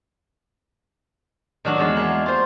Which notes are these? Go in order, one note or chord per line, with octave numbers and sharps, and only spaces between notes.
D#3 F#3 D4 F#4
E2 G#3
A#3 E5
F4 C5